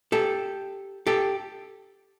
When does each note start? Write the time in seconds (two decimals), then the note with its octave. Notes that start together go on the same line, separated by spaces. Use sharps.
0.12 G4 A4
1.07 G4 A4